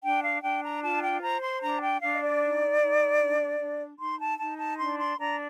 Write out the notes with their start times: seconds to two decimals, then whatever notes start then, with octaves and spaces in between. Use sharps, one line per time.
0.03 D4 G5
0.23 F5
0.42 D4 G5
0.63 A#5
0.82 F4 A5
1.02 G5
1.22 C5 A#5
1.41 C6
1.61 D4 A#5
1.82 G5
2.01 D4 F5
2.13 D#5
2.21 D5
2.41 D#4
2.81 D#4
3.20 D4
3.60 D4
3.99 D#4 C6
4.19 A5
4.39 D#4 A5
4.58 A5
4.78 D4 C6
4.99 C6
5.19 D4 A#5